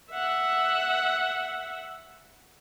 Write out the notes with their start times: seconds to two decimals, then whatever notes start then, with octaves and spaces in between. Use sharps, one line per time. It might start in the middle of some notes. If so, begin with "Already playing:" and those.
0.11 E5 F#5